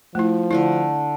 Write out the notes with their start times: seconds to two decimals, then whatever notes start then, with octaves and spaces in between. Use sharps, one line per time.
0.15 F3 A3 E4
0.51 D3 A3 D4 E4